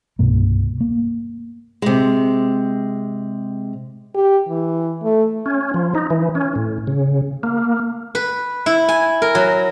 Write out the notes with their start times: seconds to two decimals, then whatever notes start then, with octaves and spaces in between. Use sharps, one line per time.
0.19 C2 G2 B2 A#3
0.81 A#3
1.82 C3 G#3
4.15 G4
4.48 E3
5.04 A3
5.46 C#4
5.74 F3
5.95 D#4
6.10 E3
6.35 C#4
6.55 A2
6.87 C#3
7.43 A#3
8.15 B4
8.66 E4
8.88 G#5
9.22 A#4
9.35 F#3